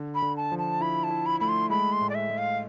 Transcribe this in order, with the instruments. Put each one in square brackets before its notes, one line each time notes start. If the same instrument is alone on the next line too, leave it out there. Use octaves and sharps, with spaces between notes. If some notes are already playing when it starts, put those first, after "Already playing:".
Already playing: [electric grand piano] D3
[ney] B5
[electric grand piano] D3
[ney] A5
[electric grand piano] F3
[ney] A5
[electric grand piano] E4 [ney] B5
[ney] A5
[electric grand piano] E4
[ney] B5
[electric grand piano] A3 [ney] B5
[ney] C6
[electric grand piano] G#3 [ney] B5
[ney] C6
[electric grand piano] A2
[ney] D5
E5
[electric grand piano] G#3
[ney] F5